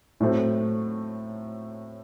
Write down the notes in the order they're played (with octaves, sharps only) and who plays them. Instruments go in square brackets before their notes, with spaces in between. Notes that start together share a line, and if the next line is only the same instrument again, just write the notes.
[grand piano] A2 F#3 A3 C4